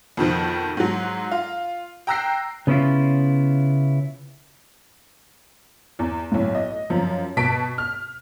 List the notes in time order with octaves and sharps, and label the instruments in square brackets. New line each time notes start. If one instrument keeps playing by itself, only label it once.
[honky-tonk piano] F2 B2 D#3 F3
G#2 F#3
F4
G5 A#5 E6 F#6 A#6 C7
[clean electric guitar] C#3 B3 C#4 E4 F4
[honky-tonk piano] E2
B1 A2
D#5
F#2 F3
B2 A5 B6 D7
F6